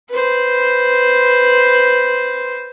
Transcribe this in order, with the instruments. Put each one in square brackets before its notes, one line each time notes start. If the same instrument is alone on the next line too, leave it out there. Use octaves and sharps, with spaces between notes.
[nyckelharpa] B4 C5